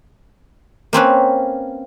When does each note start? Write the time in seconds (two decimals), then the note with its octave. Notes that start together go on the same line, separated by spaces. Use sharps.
0.93 A#3 C4 C#4 B4